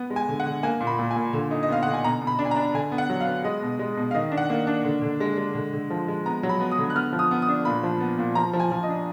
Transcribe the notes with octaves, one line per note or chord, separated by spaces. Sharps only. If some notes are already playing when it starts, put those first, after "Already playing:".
Already playing: B3
G#3
G#5
D3
F#5
D3
A#3 G#5
A#2
B5
A#2
G#5
A#2
D3
D#4
D#5
B3 F5
D3 F#5
G#5
B2 A#5
B2
B5
D4
G#5
A#5
D4
D3 G#5
B3
F#5
F#3
F5
B3
G#3 D#5
B2
G#3
B2
F5
D#3 D#5
D4
F#5
A#3
D4
D3
D3
G#3
G#3
D3
D3
F3
G#3
B3 A#5
F#3
B5
B3
D#6
D3
F#6
B3 F6
F3
D#6
B3
D#6
D4
A#2 B5
F3
B3
A#2
F3 A#5
F3
G#5
F3
D#5
D4